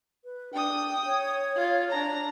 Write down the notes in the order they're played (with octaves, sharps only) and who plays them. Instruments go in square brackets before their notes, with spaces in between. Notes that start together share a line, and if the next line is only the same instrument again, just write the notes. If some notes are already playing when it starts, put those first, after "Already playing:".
[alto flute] B4
[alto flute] D4 [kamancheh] G5 D#6
[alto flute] C#5
[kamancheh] F4
D4 A#5